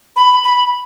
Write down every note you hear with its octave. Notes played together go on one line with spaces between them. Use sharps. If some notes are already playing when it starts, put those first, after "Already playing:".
B5
B5